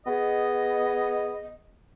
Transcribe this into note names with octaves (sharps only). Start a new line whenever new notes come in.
B3 G#4 D#5